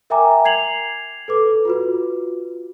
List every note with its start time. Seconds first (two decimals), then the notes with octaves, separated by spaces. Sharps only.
0.10 A#4 E5 G5 G#5 A#5 D6
0.45 G#6 C7 F7 F#7
1.28 A4 B4 D6
1.65 F4 F#4 B4